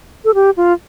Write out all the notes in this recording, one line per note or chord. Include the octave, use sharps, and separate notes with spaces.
A4
G4
F4